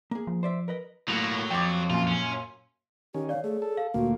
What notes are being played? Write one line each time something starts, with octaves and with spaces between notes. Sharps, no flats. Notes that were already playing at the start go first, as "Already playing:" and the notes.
A#3 G#4
F3
C5 D5 E5
A#4 B4 D#5
A2 F#3 A#3
F2 G5 D6
F#2 A#2 F4
C#4
D#3 C#4 G4
C#5 D5 F5
A3 G#4
A4
F5
D2 A#2 A#3 F#4